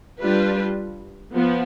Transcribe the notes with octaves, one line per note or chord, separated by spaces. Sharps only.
G3 D4 F4 B4
F3 B3